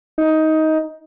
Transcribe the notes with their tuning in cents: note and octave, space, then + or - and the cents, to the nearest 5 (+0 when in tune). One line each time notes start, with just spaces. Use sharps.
D#4 +15